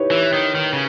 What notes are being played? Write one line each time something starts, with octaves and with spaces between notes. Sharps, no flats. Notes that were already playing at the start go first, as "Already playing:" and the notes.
Already playing: D#4 E4 G4 B4 C#5
E3
D#3
D#3
C#3